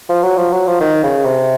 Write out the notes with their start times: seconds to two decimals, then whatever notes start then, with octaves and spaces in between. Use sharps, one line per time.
0.09 F3
0.23 F#3
0.37 F3
0.52 F#3
0.67 F3
0.81 D#3
1.04 C#3
1.25 C3